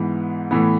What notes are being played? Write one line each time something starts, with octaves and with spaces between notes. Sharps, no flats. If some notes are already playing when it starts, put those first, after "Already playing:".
Already playing: G#2 E3 B3
A2 E3 B3